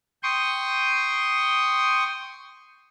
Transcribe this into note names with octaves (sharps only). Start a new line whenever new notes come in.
G5 C6 C#6 D#6